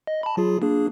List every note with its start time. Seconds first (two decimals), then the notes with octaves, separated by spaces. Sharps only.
0.07 D#5
0.23 A5 B5
0.37 F#3 F4 G#4
0.62 A#3 D4 G#4